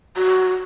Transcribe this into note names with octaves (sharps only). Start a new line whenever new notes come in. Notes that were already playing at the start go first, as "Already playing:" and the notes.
F#4